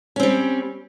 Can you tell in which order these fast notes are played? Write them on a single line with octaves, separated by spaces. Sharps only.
C#4 C4 G3